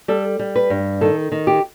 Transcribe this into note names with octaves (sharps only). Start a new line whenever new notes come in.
G3 A4
G3
B4
G2
D#3 A4
D#3
G4